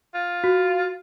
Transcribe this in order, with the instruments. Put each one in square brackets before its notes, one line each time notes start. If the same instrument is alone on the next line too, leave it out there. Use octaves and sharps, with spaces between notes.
[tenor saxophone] F4
[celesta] F#4